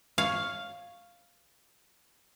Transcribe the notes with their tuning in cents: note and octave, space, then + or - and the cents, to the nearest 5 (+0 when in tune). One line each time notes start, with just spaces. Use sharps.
C#5 +0 F5 +0